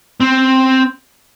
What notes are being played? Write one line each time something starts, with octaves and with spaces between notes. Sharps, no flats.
C4